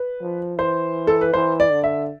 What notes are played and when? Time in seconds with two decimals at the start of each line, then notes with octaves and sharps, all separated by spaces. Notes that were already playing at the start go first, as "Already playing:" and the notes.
Already playing: B4
0.21 F3
0.58 E3 C5
1.07 A4
1.21 B4
1.33 E3 C5
1.60 D5
1.72 D3
1.84 E5